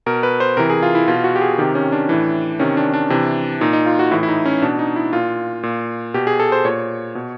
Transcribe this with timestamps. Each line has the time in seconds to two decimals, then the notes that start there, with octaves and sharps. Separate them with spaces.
0.06 B2 A#4
0.23 B4
0.40 C5
0.57 C3 E3 A#4
0.70 G#4
0.83 F4
0.95 E4
1.08 B2 F4
1.24 F#4
1.36 G4
1.42 G#4
1.58 C3 D#3 G4
1.75 C#4
1.92 D4
2.09 A2 E3
2.59 C3 D#3 C#4
2.77 D4
2.94 D4
3.10 C3 E3
3.61 A#2 D#4
3.73 D#4
3.86 F4
3.99 F#4
4.11 A2 E3 E4
4.23 E4
4.29 D#4
4.46 C#4
4.62 B2 D4
4.79 D#4
4.96 E4
5.13 A#2 F4
5.63 A#2
6.14 B2 G4
6.27 G#4
6.40 A4
6.52 C5
6.65 A#2 C#5
7.15 B2